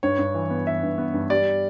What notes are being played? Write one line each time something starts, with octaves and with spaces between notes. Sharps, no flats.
G2 C#5
G2
E3
B3
E3 E5
G2
B3
G2
G3 D5